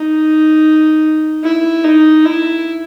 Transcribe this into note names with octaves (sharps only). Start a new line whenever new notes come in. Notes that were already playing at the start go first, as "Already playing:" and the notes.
Already playing: D#4
E4
D#4
E4